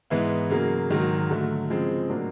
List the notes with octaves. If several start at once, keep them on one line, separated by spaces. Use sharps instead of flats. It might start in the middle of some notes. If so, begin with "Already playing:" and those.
G#2 E3 G#3 B3 E4
C#3 F#3 A#3
G#2 D#3 F#3 A#3
D3 F#3 A3
C#3 F3 G#3 C4
A2 F#3 A#3 D4